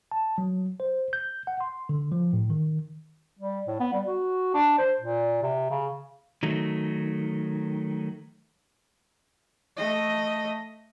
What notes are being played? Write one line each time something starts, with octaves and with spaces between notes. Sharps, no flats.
A5
F#3
C5
G6
F#5
C6
D3
F3
A2
D#3
G3
A2
B3
G3
F#4
D4
C5
A#2
C3
C#3
D#3 F#3 A3
A3 D#5